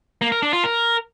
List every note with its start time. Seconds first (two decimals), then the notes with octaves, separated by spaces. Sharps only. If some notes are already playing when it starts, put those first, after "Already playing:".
0.22 A#3
0.32 A#4
0.43 D4
0.53 F4
0.64 A#4